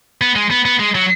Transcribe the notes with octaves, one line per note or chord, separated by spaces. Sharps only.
B3
G#3
B3
B3
G#3
F#3